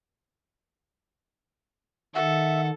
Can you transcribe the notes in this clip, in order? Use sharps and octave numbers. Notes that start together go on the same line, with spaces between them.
D#3 A4 E5 F#5